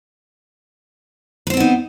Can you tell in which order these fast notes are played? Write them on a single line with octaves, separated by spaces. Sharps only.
B4 C5 C4 B3 D#4